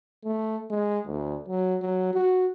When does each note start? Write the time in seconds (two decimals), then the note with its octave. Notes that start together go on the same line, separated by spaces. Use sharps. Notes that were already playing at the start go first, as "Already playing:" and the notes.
0.25 A3
0.71 G#3
1.07 D2
1.48 F#3
1.82 F#3
2.14 F#4